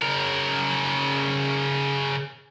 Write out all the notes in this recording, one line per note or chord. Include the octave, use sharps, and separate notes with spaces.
C#3 A#4